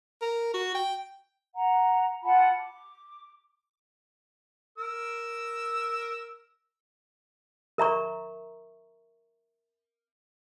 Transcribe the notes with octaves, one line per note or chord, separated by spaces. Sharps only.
A#4
F#4
G5
F#5 A#5
F4 F#5 A5 B5
D6
A#4 E6
A#4 E5 A#5 C#6